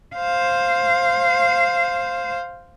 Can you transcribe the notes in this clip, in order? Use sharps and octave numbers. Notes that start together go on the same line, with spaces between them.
C5 F5